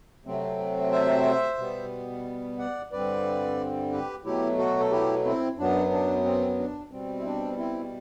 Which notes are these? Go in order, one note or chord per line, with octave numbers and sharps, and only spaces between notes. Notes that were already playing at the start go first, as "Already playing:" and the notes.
C3 F#3 A3 C4
C5 E5
B2 G3 B3
D5 F#5
G2 D3 G3 C4 B4 D5
G4 B4
B2 F#3 A3 E4 G4
F#4 A4
A4
E4 G4
C4 E4
F#2 F#3 B3 D4
D4
C4
D4
B2 G3 C4
E4
D4
C4 E4